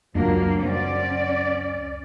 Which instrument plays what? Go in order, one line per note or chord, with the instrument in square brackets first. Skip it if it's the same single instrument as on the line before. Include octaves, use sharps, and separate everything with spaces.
[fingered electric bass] C#2 F#2 [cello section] F#3 A#3 [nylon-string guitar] D4 F4 F#4
[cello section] C#4 D5 [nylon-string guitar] C5 F#5